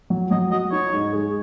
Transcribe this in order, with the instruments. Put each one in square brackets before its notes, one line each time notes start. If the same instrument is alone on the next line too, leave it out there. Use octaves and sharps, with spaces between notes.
[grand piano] F#3
[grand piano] F#3 [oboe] D#5
[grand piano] F#4 [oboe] D#5
[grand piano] D#4 [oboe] C#5
[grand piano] G#2
G#3